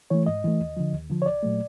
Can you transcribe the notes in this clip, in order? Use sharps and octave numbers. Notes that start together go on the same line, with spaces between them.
E3 A3 C#5
G#2 D#5
E3 A3
D#2
D3 F3
D#2
D3 F3
C#5
C2 D5
A#2 F#3 A3